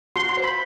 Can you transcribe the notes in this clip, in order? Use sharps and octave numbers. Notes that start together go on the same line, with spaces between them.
F#4 C6
C6
C5
B5